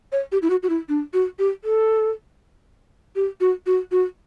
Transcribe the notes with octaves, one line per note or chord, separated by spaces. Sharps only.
C#5
G4
E4
F#4
F#4
E4
D4
F#4
G4
A4
G4
F#4
F#4
F#4